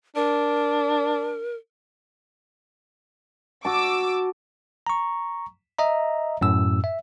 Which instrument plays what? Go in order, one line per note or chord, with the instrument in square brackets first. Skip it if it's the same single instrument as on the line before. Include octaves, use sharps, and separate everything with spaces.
[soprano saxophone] D4 [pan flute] A#4
[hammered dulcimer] F#4 A5 [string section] D6 E6
[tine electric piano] A#5 C#6
D#5 E5 A#5
F#2 A2 E6
E5